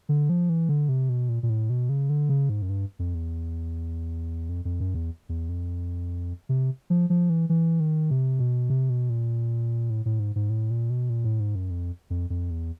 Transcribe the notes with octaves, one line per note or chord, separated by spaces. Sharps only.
D3
F3
E3
D3
C3
B2
A#2
A#2
A2
B2
C#3
D3
C#3
G#2
F#2
G2
F2
E2
F2
F2
F#2
E2
E2
F2
C3
F3
F3
E3
E3
D#3
C3
B2
C3
B2
A#2
A2
A2
G#2
G#2
A2
A#2
B2
A#2
A2
G#2
F#2
F2
F2
F2
E2